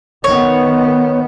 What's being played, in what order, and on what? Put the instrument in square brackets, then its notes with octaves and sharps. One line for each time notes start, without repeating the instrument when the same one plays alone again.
[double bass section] D#3 B3 [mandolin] C#5